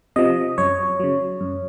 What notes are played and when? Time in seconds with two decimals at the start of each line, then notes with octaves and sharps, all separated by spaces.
0.16 C3 F3 D#5
0.58 F#2 C#5
1.00 C#3 F#3
1.41 F#2